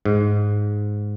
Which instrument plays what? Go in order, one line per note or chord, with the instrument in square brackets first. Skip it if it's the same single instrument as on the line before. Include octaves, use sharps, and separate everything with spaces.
[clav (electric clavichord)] G#2